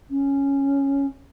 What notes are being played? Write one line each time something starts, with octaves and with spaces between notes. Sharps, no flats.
C#4